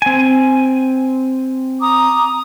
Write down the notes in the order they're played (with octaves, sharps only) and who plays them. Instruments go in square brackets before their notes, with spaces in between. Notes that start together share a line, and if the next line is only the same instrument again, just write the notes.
[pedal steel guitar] C4 G#5
[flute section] A#5 D6 D#6